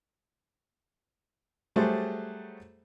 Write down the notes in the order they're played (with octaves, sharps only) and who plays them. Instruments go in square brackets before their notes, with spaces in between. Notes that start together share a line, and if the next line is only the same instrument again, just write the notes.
[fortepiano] F#3 G3 A3 G#4 C5